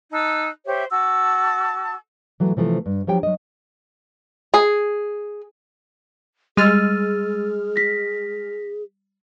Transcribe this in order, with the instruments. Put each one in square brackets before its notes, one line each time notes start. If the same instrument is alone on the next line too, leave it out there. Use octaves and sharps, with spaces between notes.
[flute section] D#4 A5 E6 F#6
G4 C5 C#5 E5
F#4 A5 D6 E6
[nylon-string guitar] E3 F#3 A3
C3 E3 F3 A3
G2
F3 F#3 G4 C#5 G5
F#3 D#5
[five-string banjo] G#4
[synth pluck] G3 [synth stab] G#3 F6 [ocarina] G#4 [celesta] E6 A6 D#7
[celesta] A#6 B6